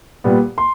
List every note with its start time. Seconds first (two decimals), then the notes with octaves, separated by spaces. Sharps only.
0.24 A#2 G3 B3
0.58 C6